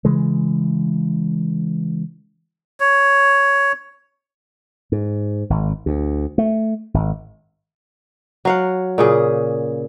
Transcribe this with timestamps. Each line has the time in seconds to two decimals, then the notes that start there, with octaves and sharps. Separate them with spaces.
0.05 C#3 E3 G#3
2.80 C#5
4.92 G#2
5.50 G#1
5.86 D2
6.38 A3
6.94 G#1
8.45 F#3 F5 F#5
8.98 A#2 C#3 G#4